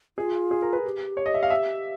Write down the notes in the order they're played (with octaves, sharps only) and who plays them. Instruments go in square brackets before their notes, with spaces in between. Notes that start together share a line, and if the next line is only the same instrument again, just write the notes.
[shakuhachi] F4 [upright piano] G#4
[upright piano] G#4
A#4
B4
[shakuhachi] G4
[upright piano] C#5
D#5
E5
F5
E5